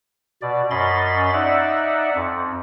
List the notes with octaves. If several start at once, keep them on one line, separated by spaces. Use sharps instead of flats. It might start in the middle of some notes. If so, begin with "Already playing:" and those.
B2 D5
F#2 C#4 D#5 B5 C6 A6
D#4 D5 E5 F#5
F2